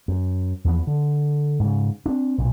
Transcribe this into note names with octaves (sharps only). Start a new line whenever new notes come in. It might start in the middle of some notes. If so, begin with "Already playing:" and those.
F#2
E2 F3 G3 B3
D3
G#2 C#3
C4 D4
B1 A#2